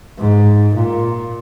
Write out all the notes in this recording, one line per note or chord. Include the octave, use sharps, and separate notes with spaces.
G#2
A#2